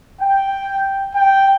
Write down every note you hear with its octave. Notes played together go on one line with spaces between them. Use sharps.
G5
G5